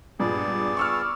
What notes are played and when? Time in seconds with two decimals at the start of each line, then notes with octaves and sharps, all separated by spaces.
0.20 G2 A#2 G#3 B3 G#4 D5
0.77 C#6 E6 F6